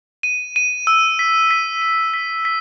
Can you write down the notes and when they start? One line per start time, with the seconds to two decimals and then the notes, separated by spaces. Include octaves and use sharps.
0.23 D#7
0.56 D#7
0.87 E6
1.19 B6
1.51 B6
1.82 D#7
2.14 B6
2.45 B6